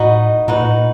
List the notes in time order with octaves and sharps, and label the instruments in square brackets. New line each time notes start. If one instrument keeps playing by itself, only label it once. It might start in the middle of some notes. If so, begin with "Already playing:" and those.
Already playing: [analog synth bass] A2 [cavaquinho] D#4 F#4 B4 D#5
[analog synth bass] A#2 [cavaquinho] D#4 F#4 B4
[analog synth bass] A2
A#2